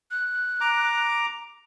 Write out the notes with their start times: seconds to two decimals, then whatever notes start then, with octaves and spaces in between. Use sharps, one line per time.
0.11 F#6
0.61 A#5 D6